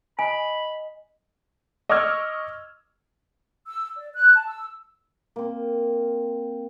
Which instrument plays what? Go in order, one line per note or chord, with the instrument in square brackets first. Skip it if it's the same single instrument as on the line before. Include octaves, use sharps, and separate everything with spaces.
[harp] D#5 [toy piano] G#5 [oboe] B5
[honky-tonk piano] D#5 C#6 D6 E6 F6 G#6
[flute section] E6
D5
F#6
A5
E6
[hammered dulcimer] A#3 C4